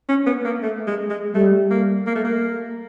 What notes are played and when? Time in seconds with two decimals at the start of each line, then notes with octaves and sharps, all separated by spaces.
0.09 C#4
0.26 B3
0.45 A#3
0.62 A3
0.87 G#3
1.10 G#3
1.34 G3 A3
1.71 A#3
2.07 A#3
2.15 A3
2.24 A#3